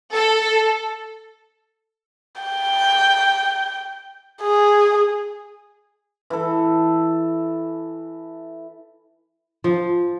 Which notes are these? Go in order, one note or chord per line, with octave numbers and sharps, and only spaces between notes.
A4
G5
G#4
E3 A4
F3